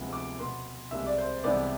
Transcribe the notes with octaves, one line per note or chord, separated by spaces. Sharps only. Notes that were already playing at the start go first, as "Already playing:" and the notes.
Already playing: D2 C3 F3 G#3 B3
D6
B2 B3 C6
C2 C3 G#3 E5
D5
C5
C2 C3 E3 G#3 B3 D5